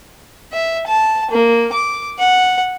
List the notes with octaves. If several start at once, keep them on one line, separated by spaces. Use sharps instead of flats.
E5
A5
A#3
D6
F#5